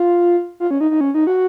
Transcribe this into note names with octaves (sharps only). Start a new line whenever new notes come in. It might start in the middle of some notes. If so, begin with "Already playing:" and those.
Already playing: F4
F4
C#4
D#4
D#4
C#4
D#4
F#4